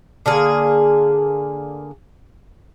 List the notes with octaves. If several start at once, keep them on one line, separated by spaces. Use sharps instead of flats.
D3 A#3 G#4